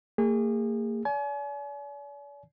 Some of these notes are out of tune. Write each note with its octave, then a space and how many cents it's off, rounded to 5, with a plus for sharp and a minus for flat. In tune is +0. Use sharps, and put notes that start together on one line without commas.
A#3 -40 G#4 -30
D5 -40 G#5 +40